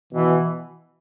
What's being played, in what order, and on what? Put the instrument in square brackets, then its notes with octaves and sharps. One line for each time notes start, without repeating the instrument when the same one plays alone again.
[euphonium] B2 [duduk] E3